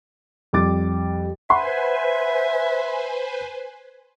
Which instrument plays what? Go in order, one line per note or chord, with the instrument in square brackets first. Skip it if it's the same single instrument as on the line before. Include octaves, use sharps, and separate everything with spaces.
[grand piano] F2 G3 D6 A6
[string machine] B4 C5 G#5 [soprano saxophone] E5 [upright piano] F#5 B5 C6